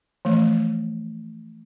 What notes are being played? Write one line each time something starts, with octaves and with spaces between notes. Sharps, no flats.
E3 F3 A3